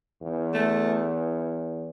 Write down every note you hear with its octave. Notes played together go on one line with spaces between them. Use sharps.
E2
A3